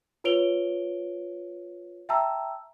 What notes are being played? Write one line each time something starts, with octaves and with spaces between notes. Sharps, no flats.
F4 B4 C#5 D7 F7 G7
E5 G5 A5 A#5 E6